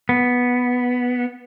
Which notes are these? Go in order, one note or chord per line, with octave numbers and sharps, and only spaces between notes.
B3